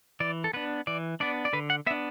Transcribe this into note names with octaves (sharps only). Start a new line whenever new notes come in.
E3 D5
A4
B3 D4 B4
E3 D5
B3 D4 D5
D5
D3 B4
F#5
B3 D4 E5